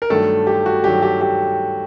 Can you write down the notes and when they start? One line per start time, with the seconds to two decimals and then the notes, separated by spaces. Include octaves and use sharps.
0.02 A#4
0.10 G2 D#3 F#3 A3 A4
0.47 G4
0.66 F#4
0.84 G2 D#3 F#3 G4
1.02 G4
1.21 G4